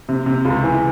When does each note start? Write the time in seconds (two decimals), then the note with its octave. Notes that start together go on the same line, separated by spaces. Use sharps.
0.09 C3
0.26 C3
0.45 C#2
0.64 E3